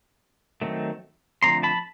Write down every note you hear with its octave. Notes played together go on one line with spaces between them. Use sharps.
D#3 F#3 A3 C4 D#4
D3 F3 A3 C4 A#5 C6
A5 B5